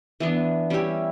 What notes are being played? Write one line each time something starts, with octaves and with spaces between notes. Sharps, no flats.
E3 B3 D4
G3 C#4 E4 G4